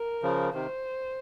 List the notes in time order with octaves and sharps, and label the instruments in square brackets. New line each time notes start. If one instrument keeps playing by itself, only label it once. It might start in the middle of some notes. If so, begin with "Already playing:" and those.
Already playing: [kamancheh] A#4
[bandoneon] C#3 F3
[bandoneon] C3 D#3 [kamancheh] C5